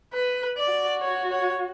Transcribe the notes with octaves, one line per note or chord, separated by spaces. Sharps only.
B4
D5
F#4
C#5
C#5